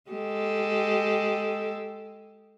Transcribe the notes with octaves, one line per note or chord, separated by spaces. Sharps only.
G#3 G4 A4